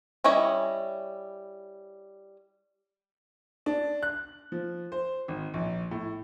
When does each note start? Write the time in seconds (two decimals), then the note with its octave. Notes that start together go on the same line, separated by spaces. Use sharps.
0.24 G3 C#4 E4 C#5 D#5
3.66 D4
4.03 F#6
4.52 F3
4.92 C5
5.28 G#1
5.54 A#1
5.91 A2